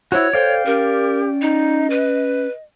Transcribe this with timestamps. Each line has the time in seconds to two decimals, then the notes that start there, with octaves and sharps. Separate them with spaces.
0.12 E4 F#4 C5 C#5
0.33 A4 C5 D5 F5 G5
0.66 C#4 G4 A#4
1.42 D#4 D#5
1.90 B4